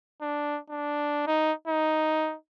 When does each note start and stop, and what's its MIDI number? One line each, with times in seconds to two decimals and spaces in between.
0.22 0.59 62
0.70 1.26 62
1.27 1.52 63
1.67 2.35 63